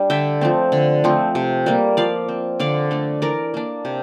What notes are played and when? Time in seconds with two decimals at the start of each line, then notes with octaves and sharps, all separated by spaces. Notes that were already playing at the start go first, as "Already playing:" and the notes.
Already playing: G3 D4
0.10 D3 E5 G5
0.41 F3 A3 C4
0.72 D3
1.04 F3 A3 C4
1.35 C3
1.66 G3 A#3
1.97 F3 D5 F5
2.28 C4
2.60 D3 D5 F5
2.91 A3 D4
3.22 E3 A#4 D5
3.54 A#3 D4
3.85 C3